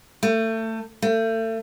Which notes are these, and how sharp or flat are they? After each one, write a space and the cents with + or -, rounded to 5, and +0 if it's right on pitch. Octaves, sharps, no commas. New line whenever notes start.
A3 +25
A3 +35